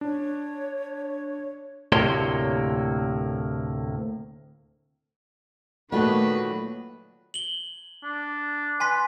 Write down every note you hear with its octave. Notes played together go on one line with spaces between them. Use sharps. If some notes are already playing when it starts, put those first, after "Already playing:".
D4 C#5
D2 A2 C3 A#3 C#5 C6
A#2 D#3 F#3 A3 A#3 F#4 B4
F#7 G7
D4
B4 G#5 C6 B6